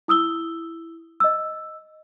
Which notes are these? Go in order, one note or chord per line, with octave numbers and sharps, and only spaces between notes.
E4 D#6 E6 G7
D#5 E6